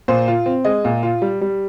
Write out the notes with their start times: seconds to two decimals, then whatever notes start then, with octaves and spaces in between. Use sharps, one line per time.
0.08 A#2 C5
0.28 F4
0.46 C4
0.65 G#3 D#5
0.85 A#2
1.03 F4
1.22 G3
1.41 G3